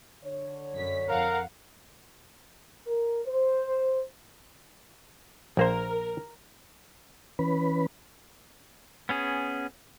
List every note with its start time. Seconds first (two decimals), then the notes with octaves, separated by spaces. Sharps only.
0.24 D3 C#5
0.75 F#2 B6
1.09 F2 A#4 F5 F#5
2.87 A#4
3.25 C5
5.57 A#1 A#3 A#4 C5
7.39 E3 C#4 B4 B5
9.09 B3 C#4 G#4